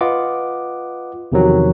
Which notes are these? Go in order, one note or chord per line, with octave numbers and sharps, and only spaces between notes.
F4 B4 D#5 F#5 D6
E2 C3 D#3 F3 F#3